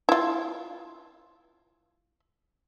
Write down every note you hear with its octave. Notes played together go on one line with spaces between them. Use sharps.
E4 F4